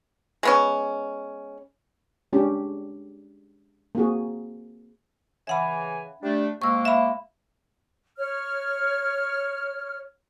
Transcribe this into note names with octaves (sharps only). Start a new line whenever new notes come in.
G#3 B3 C#4
G#3 C#4 D4 G4
A#3 C4 F#4 G#4
C#3 E3 E5 F#5 G#5 B5
G3 A3 D4
C3 G#3 A#3 C#6 E6
E5 F5 B5
C#5 F6